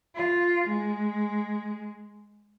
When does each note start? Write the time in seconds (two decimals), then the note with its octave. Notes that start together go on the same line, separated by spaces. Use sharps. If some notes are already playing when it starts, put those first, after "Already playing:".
0.15 F4
0.69 G#3